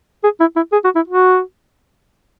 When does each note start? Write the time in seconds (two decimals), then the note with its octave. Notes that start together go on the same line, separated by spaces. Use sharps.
0.24 G#4
0.40 E4
0.56 E4
0.72 G#4
0.84 F#4
0.95 E4
1.08 F#4